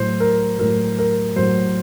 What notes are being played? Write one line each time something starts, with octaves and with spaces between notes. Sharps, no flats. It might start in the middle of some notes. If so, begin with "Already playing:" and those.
Already playing: A2 F#3 C5
A#4
A2 F#3 A#4
A#4
A2 F#3 C5